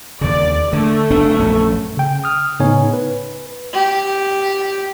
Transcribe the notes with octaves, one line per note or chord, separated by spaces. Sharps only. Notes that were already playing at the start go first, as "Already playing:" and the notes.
D#2 C#3 D5
D3 A3
F#1 B3 D4
A#1 F#2 C#4
C#3 G5
D#6 F6
A2 C#3 B3 D#4 C#5 G#5
B4
G4